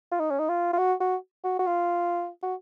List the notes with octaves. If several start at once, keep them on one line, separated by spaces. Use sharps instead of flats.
F4
D#4
C#4
D#4
F4
F4
F#4
F#4
F#4
F#4
F4
F#4